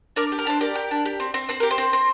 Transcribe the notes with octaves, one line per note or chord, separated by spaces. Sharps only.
D4 A#4 D5
G4
A#4
D4 C5
G4 A#4 D5
G4
D4
G4
C4
C4
C4 C5
G4 A#4
C5
C4
C4